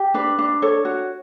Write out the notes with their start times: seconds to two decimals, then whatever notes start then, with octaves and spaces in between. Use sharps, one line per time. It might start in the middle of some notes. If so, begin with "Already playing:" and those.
Already playing: G4
0.14 D4 B4
0.39 D4
0.62 A4 C#5
0.85 F#4